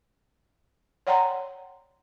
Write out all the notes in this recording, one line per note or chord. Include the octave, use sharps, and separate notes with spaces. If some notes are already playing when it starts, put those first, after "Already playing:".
C#5 D5 F#5 G5 A#5 C6